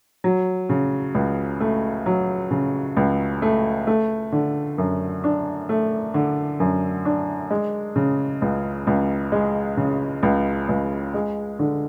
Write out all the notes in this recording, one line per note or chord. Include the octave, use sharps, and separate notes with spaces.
F#3
C#3
C#2
A3
F#3
C#3
C#2
A3
A3
D3
F#2
D4
A3
D3
F#2
D4
G#3
C#3
C#2
C#2
G#3
C#3
C#2
C#2
G#3
D3